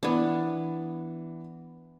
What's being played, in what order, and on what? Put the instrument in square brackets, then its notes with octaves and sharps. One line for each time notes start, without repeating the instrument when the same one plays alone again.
[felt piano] E3 [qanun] B3 D4